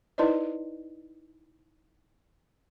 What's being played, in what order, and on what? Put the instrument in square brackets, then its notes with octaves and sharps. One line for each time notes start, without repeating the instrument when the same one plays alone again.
[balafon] D#4 E4 B4 C5 D5 D#5